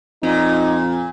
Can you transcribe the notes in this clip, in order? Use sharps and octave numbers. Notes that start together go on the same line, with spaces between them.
F2 A#2 D#4